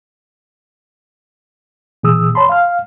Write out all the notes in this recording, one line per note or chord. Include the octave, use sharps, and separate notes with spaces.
A#2 E3 G#4 D#6 E6
C#5 A5 B5 C6
F5 F6